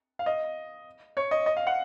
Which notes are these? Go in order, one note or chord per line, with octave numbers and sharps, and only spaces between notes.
F5
D#5
C#5
D#5
D#5
F5
F#5